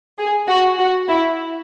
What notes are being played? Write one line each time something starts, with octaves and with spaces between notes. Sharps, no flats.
G#4
F#4
F#4
E4